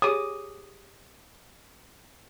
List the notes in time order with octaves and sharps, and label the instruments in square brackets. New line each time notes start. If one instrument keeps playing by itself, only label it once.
[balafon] G4 G#4 C#5 [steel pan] D6 D#6